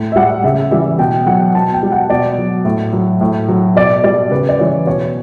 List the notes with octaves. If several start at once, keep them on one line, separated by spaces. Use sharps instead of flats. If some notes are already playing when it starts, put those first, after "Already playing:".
Already playing: A2
E5
G3 F#5
C#3 E5
E3 G3 E5
B2 G5
F#3 F#5
B2 A5
G5
G3
F#5
B2 D5
F#3
A2
F#3
A2
F#3
B2 D5
G3 D5
C#3 B4
D5
E3 G3 C#5
B2 C#5